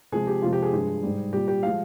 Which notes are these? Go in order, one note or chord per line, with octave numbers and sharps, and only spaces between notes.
C3 F3 G#3 G#4
G4
F2 C3 F3 G#3 F4
G4
G#4
G2 F3 G#3
G#2 G3
A#2 G3 G4
G4
F3 G#3 F5